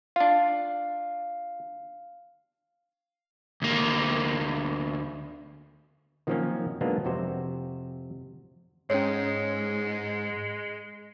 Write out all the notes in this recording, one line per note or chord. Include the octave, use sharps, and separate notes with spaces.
D4 F4 F5
D2 A#3
D#3 F3 F#3 A#3 C4 C#4
F#3 G#3 A#3 B3 D4 F4
F2 C3 F#4 C5
G#2 G#3 C#4 C#5